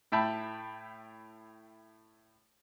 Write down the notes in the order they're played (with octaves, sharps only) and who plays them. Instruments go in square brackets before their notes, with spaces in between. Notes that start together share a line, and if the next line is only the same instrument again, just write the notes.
[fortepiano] A2 E5 G5 A5 B5